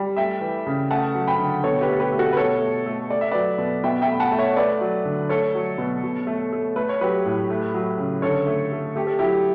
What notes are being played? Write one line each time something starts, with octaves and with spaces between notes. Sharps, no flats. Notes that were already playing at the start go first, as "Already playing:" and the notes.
Already playing: G3
A3 E5 G5
E3
C#3
A3 F#5 A5
F#3
G5 B5
D3
B2 A4 C#5
G4 B4
A3 A4
G4 B4
A3
F#4 A4
B4
B2 A4 C#5
A3
A3
A3 D5
E5
F#3 B4 D5
B2
B2 E5 G5
E5 G5
A3 B5
F#5 A5
A3
C#5 E5
A3 B4 D5
F#3
D3
A3 A4 C#5
F#3
B2
B2
A3
A3
A3 B4
C#5
F#3 G4 B4
A2
A3
F#3
C#3
D3 A4 C#5
A3
A3
A3 G4
A4
F#3 E4 G4